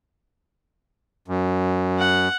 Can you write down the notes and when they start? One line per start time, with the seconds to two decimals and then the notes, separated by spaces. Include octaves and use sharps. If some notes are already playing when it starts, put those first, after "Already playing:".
1.28 F#2
1.99 F#5